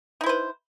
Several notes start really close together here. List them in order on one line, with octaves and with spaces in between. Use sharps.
D#4 E4 C5 B4